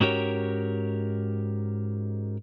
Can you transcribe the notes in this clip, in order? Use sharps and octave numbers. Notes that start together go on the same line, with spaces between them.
G#2 C#4 F#4 G4 A#4 C#5